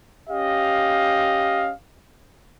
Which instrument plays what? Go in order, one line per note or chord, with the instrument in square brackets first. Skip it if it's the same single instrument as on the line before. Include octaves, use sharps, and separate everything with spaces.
[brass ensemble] C#4 G4 D#5 F5